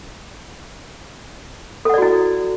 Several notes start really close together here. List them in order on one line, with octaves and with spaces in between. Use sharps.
A4 F#5 D5 F#4 E4